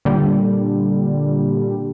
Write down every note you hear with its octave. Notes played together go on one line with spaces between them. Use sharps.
A#2 D3 G3